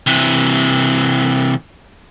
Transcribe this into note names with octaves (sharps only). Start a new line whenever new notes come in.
C3 E3